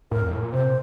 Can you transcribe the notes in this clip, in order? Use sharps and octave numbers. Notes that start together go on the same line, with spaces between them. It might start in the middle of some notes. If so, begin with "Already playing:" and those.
A2 A#4
F2
A2
A#2
C3 C5